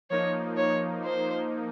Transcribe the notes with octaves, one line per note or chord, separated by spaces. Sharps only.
F3 A#3 D#4 C#5
C#5
C5